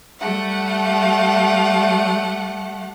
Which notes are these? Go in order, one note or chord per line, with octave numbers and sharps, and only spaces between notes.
G3 A3 F#5